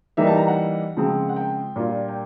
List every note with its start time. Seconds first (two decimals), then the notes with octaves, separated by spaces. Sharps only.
0.17 E3 G3 A#3 D#4 E5
0.27 A5
0.37 A#5
0.48 F#5
0.97 C#3 F3 G#3 C4
1.29 F#5
1.36 G5
1.76 A#2 G3 A#3 D4 F4
2.08 G5